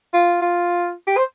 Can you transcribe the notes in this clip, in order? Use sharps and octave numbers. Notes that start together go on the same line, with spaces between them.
F4
F4
G4
C5